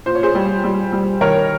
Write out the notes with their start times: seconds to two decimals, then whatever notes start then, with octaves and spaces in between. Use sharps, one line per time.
0.06 A#2 C5
0.15 C#5
0.23 G#4 C5
0.35 G3
0.64 G3
0.92 G3
1.21 D#3 A#4 C#5